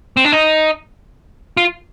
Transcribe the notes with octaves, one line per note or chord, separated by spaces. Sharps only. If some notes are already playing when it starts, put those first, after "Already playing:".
C4
D4
D#4
F4